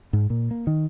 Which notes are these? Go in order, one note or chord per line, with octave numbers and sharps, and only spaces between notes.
G#2
A#2
A#3
D#3